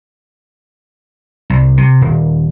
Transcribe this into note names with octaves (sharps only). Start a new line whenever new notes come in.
C2
C3
D#1